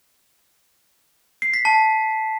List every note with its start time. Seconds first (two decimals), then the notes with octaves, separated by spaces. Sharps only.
1.42 C7
1.54 B6
1.65 A5